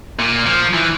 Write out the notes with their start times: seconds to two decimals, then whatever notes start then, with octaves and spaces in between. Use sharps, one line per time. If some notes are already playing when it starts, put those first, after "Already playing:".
0.19 A#2
0.46 F3
0.74 E3